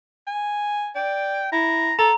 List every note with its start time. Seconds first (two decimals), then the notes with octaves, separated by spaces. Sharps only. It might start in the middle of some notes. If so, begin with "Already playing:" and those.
0.27 G#5
0.96 D5 G5
1.52 E4 A#5
1.99 A4 A#5